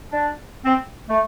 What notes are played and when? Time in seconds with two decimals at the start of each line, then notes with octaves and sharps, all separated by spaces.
0.12 D4
0.65 C4
1.09 A3